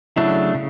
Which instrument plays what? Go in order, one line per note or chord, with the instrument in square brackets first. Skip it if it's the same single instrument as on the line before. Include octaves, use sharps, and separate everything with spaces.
[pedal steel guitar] C#3 F#3 A3 D4 [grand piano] E4
[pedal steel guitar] C#3